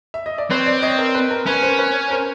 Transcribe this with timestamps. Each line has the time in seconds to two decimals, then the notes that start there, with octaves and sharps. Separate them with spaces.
0.14 E5
0.26 D#5
0.38 D5
0.50 C4 B4 C#5
0.66 C5 D5
0.82 C#5 D#5
0.98 A#4
1.15 B4
1.30 A#4
1.46 C#4 B4
1.63 A#4 C5
1.78 B4 C#5
2.10 A#4 C5